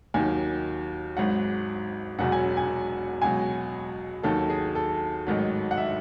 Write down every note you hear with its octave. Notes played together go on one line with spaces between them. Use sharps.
D#2 D#3 F#3 G#5
G#1 G#2 F#3 F#5
E1 E2 B2 F#3 F#5
G#5
G#5
C#2 B2 F#3 G#5
D#2 D#3 F#3 A4
G#4
A4
A1 G#2 D#3 F#3
F#5
E5